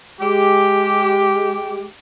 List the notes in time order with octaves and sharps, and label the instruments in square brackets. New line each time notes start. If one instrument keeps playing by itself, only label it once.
[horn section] G#3 G4